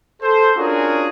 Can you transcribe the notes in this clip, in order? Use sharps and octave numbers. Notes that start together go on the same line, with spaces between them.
A4 C5
C#4 D4 F4 F#4 G#4 A#4